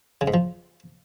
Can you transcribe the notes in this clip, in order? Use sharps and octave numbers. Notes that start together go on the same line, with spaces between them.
C#3
G#2
F3